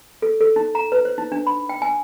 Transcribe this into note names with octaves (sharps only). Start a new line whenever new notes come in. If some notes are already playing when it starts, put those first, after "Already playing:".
A4
A4
D#4
A#5
B4
C5
D#4
D4
B5
G5
G#5